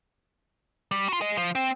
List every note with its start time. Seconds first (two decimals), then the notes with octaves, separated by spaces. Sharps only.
0.91 G3
1.08 F4 F#4
1.21 G#4 D#5
1.37 F3
1.55 C4